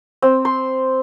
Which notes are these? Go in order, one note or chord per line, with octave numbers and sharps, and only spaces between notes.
C4
C6